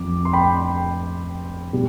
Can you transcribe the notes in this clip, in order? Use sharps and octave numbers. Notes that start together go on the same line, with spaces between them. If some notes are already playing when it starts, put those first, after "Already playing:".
Already playing: F2 D6
C6
G5 B5
B2 G3